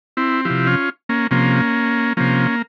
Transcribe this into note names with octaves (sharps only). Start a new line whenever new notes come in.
C4 E4
C3 F3 E4 G4
C#4 F4
A#3 C#4
C3 F3 A#3 C#4
C3 F3 A#3 C#4